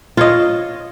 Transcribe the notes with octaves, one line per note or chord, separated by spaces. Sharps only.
F4 C#5 D#5